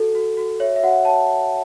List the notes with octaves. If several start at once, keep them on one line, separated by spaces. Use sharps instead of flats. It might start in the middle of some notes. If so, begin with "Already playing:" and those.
Already playing: F#4 A4
F#4
F#4
C#5 E5
E5
F#4 F#5
C#5 A5